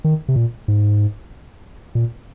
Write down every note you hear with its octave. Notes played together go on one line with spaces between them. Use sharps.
D#3
C3
A#2
G#2
A#2